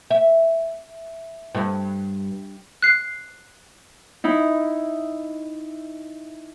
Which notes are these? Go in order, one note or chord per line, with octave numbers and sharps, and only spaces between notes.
E5
G2
F#6 C7
D#4 E4